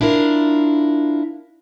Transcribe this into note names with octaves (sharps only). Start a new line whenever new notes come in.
D4 E4 F4 A#4